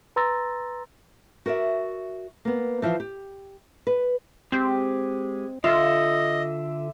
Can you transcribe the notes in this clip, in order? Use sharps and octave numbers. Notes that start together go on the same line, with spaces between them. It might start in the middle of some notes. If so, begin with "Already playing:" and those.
B4 A#5 C6 E6 A6 A#6
F#4 A#4 D5 E5
A#3 B3
E3 F3 B4 C5 F5
G4
B4
G#3 C4 G4 G6
D3 F4 A4 D#5 E5